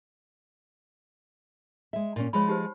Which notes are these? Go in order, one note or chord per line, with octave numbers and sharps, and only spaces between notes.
G#3 E5
A#2 C#4
F3 G#3 C#5 B5
D#4 G4 C5